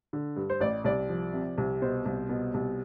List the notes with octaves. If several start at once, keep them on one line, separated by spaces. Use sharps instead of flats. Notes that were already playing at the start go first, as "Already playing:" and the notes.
D3
G2
C5
A1 D5
C2 D5
F3
C3
C2
B2 C5
C2
B2
C2